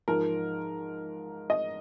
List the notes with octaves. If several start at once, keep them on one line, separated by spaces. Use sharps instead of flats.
G#2 F3 A#4
D#5